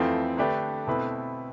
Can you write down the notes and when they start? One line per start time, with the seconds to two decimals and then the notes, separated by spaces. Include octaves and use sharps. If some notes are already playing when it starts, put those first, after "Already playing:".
Already playing: F2 E3 A3 C4 F4
0.37 D3 A3 D4 G4 B4
0.87 B2 A3 C4 E4 B4